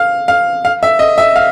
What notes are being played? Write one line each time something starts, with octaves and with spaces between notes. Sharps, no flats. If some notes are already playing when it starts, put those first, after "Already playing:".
Already playing: F5
F5
F5
E5
D#5
E5
F5